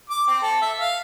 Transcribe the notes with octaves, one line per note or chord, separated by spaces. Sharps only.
D6
C4
A4
E5
F5